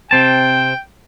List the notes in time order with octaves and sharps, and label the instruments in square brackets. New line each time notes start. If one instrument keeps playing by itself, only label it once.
[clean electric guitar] C3 C4 A5 [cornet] G5